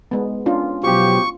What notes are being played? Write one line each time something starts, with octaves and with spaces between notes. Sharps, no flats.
G#3 B3
C#4 D4 F4
B2 F3 F#3 F4 G4 C#6